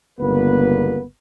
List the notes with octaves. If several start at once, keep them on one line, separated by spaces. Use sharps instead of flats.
G1 C#2 D3 A#3 B3 B4